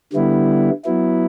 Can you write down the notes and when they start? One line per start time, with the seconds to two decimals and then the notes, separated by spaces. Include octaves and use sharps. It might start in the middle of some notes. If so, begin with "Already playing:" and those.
0.13 D3 G3 B3 E4
0.84 F#3 B3 E4